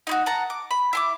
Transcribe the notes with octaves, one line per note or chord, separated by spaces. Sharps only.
D#4 E4 F#4
F#5 A5 A#5
D6
B5
E4 C6 D6